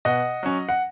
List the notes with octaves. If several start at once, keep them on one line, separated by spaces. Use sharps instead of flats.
B2 D#5 F#5
F#3 C#4
F#5